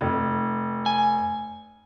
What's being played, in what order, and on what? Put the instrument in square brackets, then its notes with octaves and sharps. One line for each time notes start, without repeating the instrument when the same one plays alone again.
[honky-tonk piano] F1
[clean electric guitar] G#5